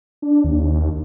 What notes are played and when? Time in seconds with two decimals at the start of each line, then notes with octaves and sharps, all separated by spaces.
0.22 D4
0.44 D#2